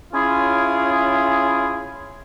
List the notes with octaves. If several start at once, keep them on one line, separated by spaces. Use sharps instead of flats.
C#4 E4 F4 G#4